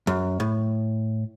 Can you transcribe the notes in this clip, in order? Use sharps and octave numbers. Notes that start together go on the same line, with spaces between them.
F#2
A2